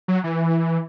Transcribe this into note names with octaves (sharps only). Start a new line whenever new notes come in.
F#3
E3